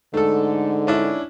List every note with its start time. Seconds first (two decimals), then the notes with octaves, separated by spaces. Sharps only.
0.14 G#2 D3 A3 A4
0.87 C#4 D4 E4